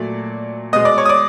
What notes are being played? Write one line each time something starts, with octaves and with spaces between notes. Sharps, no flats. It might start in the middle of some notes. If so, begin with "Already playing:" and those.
Already playing: A#2 F#3 A3 D5
B2 G#3 D#5 D#6
D5 D6
C#5 C#6
D#6
D5 D6